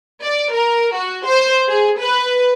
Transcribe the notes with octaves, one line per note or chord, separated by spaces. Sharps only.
D5
A#4
F#4
C5
G#4
B4